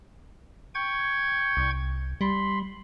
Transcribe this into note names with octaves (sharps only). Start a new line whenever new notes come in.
G5 C#6 G#6
C2
G3 B5 C6